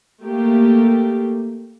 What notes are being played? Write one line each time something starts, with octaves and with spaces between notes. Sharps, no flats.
A3 A#3 G4